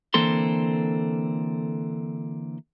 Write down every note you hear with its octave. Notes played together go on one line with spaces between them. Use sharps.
D3 E3 A#3 C4 A4 C6